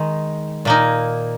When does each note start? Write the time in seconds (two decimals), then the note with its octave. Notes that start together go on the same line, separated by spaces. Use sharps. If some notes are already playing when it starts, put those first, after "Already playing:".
Already playing: D#3 G#3 D#4
0.65 A#2 A#3 D#4